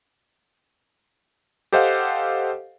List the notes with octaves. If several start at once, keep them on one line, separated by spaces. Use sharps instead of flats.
G4 A4 C5 D#5 F5 F#5